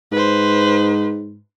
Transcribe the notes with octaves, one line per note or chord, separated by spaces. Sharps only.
G#2 B4 C5